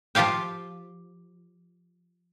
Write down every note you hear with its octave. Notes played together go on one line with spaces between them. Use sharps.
F3 F4 G4 F5 G5